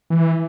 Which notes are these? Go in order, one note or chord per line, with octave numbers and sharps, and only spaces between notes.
E3